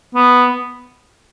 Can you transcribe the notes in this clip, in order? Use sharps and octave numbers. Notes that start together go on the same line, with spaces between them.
B3